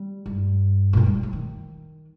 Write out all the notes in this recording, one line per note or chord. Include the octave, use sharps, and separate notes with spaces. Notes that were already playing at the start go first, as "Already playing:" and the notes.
Already playing: G3
G2
A#2
G2
G3
F3
D#3